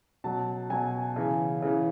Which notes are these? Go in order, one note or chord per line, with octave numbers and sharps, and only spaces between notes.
B2 F#3 A5
B2 F#3 G#5
C#3 E3
C#3 E3